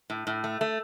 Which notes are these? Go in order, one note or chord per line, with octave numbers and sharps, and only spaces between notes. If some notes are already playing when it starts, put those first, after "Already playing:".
A2
A2
A3
A3